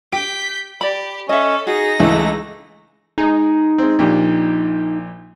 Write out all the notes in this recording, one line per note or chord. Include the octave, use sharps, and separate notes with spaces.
G4 G6 B6 D7
G4 D5 B5
C#4 A4 D#5 E5
D#4 F#4 G#4 A#6
C#2 E3 A3
G#3 D#4 G#4
G#3 C4
A#1 A#2 G4